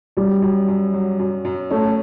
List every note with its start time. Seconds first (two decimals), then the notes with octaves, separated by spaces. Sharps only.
0.17 F#2 G3
0.42 F#2
0.68 F#2
0.94 F#3
1.19 F#2
1.45 F#2
1.70 A3 C#4